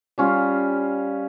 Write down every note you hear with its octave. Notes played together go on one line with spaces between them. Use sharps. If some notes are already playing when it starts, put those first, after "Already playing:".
G3 C#4 F4